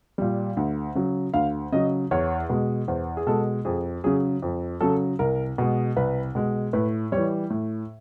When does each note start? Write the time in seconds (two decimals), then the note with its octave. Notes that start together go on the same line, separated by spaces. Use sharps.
0.18 A#2 G3
0.57 D2
0.95 C#3 F#3
1.34 D2 F5
1.72 C#3 F#3 D#5
2.11 E2 C#5
2.50 B2 G#3
2.88 E2 C5
3.17 G#4
3.27 B2 G#3 A4
3.65 F2 G#4
4.04 C#3 F#3 G#4
4.42 F2
4.81 C#3 F#3 A4
5.19 C2 A#4
5.58 B2 G#3
5.96 C2 B4
6.35 B2 G#3
6.73 A2 B4
7.12 E3 G3 C#5
7.50 A2